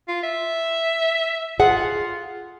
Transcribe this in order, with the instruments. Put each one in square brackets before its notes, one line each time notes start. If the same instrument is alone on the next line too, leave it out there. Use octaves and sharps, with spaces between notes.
[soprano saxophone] F4
E5
[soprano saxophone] F4 [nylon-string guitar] G#4 F#5